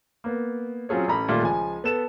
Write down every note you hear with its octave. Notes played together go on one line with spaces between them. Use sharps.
A#3 B3
F#3 C4 C#4 F4 G#4 C#5
A1 C#4 A4 A#5 B5
A#2 D#3 G3 A3 F4
C#2 F3 G#5
B3 A4 E7